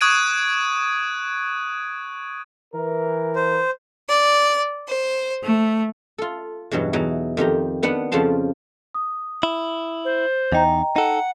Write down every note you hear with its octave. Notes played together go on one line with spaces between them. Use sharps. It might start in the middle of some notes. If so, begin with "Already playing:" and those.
C#6 D#6 F#6 G#6 D7 D#7
E3 A#4
C5
D5
C5
A3
F4 A4
E2 G2 B2 F#3
E2 F#3 D#4
F2 D#3 G4 A#5
D#3 B3 D4 F#5
F2 C#3 F3 A5 C6
D#6
E4
C5
E2 D#4 D#5 G5 A#5
D#4 A4 F#5